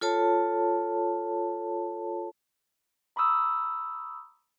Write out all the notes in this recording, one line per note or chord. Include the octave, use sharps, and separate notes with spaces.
F4 A4 C#5 A5
A#5 B5 C#6 D#6 E6